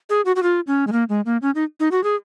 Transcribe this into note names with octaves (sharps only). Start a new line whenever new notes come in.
G#4
F#4
F#4
F4
C#4
G#3
A#3
G#3
A#3
C#4
D#4
D#4
F#4
G#4